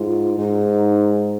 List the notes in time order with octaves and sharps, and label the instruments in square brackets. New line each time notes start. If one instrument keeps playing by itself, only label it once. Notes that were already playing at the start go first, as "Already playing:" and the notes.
Already playing: [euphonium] G#2 [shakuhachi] F4
[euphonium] G#2 [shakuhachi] D#4